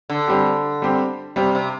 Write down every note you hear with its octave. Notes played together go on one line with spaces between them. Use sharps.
D3
G3 C4 G4
G3 C4 G4
C3 G3 C4 G4
C3